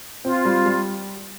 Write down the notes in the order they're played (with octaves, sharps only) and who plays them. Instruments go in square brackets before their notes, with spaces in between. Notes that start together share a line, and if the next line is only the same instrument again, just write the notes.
[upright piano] C4 [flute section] F4
[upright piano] G3
G3